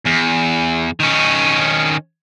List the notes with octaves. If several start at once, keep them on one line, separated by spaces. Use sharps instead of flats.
E2
D#3 C#4